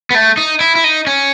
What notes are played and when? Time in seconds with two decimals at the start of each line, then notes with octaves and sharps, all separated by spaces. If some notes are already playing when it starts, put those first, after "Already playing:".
0.11 B3
0.15 A3
0.37 D#4
0.60 E4
0.75 E4
0.84 D#4
1.07 C#4